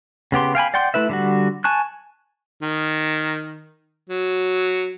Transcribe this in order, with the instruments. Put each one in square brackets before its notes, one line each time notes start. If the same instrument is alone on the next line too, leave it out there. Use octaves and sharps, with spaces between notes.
[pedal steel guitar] C#3 B3 G4 C6
F5 G5 G#5 B5
D5 F#5 G5 C6
A3 E4 B4 E5
D3 G3 F#4
G#5 A5 C#6 F#6
[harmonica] D#3
F#3